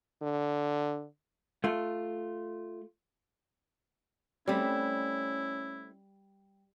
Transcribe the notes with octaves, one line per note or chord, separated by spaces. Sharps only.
D3
A3 F4
G3 A3 C4 C#4 E4